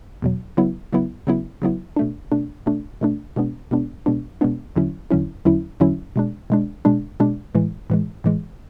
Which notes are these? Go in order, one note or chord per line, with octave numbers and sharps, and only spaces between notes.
E2 B2 F#3
C#3 F#3 B3 E4
C#3 F#3 B3 E4
C#3 F#3 B3 E4
C#3 F#3 B3 E4
B2 A3 D4
B2 A3 D4
B2 A3 D4
B2 A3 D4
B2 G#3 B3 D4
B2 G#3 B3 D4
B2 G#3 B3 D4
B2 G#3 B3 D4
E2 D3 F#3 C#4 E4
E2 D3 F#3 C#4 E4
E2 D3 F#3 C#4 E4
E2 D3 F#3 C#4 E4
B2 G#3 D4
B2 G#3 D4
B2 G#3 D4
B2 G#3 D4
A2 E3 G#3
A2 E3 G#3
A2 E3 G#3